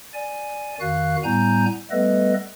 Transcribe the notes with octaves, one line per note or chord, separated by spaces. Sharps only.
D5 G#5
F2 D#3 F#4 F5 F#6
A2 G3 B3 G#5 A#5 G6
G3 A3 B3 A4 B4 D#5